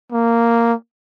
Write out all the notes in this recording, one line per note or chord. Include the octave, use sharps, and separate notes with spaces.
A#3